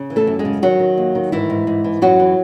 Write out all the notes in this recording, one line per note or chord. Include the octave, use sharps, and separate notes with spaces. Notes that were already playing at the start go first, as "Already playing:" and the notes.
Already playing: C#3
E3
A3 A4
F#2
G#3 G#4
C#3
D#3 F#3 F#4
D#3
D#2
D#3
G#2 E3 E4
G#2
G#2
E3
F#2 F#3 F#4
E3